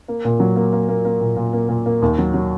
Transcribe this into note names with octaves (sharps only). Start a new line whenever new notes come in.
A#3
A#2
F#3
A#3
A#3
A#3
A#3
A#2
A#2
A#3
A#2
A#3
D#2
F#3
F#3